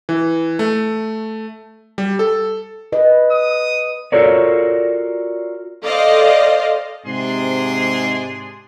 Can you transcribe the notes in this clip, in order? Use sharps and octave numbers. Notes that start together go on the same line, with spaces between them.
E3
A3
G3
A4
B4 D#5
D#6
F4 F#4 A4 A#4 C#5 D5
A4 C5 D5 D#5 F5
G#2 C3 D4 G#4 C6